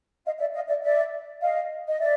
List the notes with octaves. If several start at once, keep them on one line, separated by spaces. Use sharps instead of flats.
D#5 F5
D5 E5
D#5 F5
D5 E5
D5 E5
D#5 F5
D#5
D5 E5